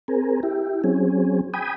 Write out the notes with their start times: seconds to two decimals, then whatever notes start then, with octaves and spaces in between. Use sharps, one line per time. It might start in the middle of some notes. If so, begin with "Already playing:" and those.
0.08 C4 G#4 A#4
0.43 E4 G4
0.84 F#3 C4 C#4 G#4
1.54 G5 G#5 B5 D#6